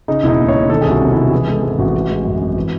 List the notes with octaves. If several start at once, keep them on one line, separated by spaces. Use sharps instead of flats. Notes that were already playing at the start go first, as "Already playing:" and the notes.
C#3 D#4
E1 D#4 E4
D#2
C#5
E1
D#3 A4
C2 G#4
F#4
C3
E4
C2
F#4
E3 G#4
G#3 A4
G#2 G#4
A1 F#4
E3
G#3
F#2
G#1
E3